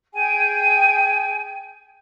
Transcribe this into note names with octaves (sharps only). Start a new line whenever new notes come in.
G#4 G5 G#5